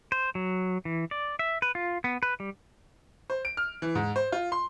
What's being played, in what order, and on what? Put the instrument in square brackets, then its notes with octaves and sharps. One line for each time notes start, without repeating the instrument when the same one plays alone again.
[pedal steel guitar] C5
F#3
E3
D5
E5
B4
F4
B3
B4
G3
[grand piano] C5
D7
F6
E3
G#2
C5
F4
C6